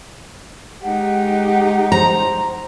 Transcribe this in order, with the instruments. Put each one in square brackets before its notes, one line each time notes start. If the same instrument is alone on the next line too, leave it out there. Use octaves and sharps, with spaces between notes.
[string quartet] G#3 D#4 G4 [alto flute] F#5
[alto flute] C5 [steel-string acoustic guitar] A#5